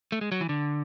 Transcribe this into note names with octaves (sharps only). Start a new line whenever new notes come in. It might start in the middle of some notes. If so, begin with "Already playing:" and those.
A3
G#3
F#3
E3
D3